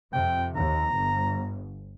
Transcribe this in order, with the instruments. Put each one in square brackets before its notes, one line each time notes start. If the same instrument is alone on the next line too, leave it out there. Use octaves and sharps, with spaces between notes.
[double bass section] F2 C3 [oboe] G5
[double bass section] D#2 [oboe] A#5
[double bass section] G1